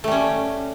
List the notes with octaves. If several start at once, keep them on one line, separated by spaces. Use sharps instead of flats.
G3 A3 C#4